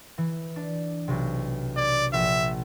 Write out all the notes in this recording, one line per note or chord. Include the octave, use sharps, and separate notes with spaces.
E3
D4
B1 C3
D5 G#6
A#1 E5